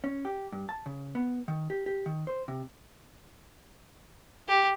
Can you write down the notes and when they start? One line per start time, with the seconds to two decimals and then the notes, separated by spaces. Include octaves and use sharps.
0.04 C#4
0.25 G4
0.52 G2
0.69 A5
0.86 C#3
1.15 B3
1.48 D#3
1.70 G4
1.86 G4
2.06 D#3
2.27 C5
2.48 C3
4.48 G4